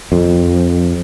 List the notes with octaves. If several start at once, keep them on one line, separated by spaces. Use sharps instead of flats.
F2